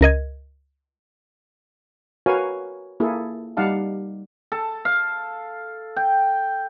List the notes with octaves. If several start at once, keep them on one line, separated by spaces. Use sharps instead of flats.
C#2 A#4 D#5 G#6
F#4 A#4 B4 C#5 F5 G#5
A#3 E4 G#4 A4
G3 D#4 D5 F5 F#5 A5
A4
F5
G5